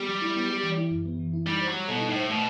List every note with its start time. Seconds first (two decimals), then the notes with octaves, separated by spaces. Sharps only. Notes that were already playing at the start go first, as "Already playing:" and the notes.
Already playing: G3 B3 G4
0.09 F#3
0.21 E4
0.36 B3
0.50 G4
0.63 E3
0.77 E4
0.91 F#2
1.05 B3
1.19 E3
1.33 E4
1.47 G3 D#4
1.61 C5
1.68 F#3
1.74 G3
1.88 B2 A4
2.01 D#4
2.09 A2
2.16 C5
2.30 B2 A3